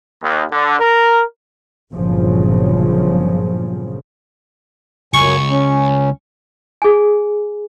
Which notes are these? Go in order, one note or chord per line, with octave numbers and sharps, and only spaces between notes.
D#2
D3
A#4
G1 A#2 C#3 F3 F#3
C#2 F#2 G#5 C#6
C#4
G#4 G#5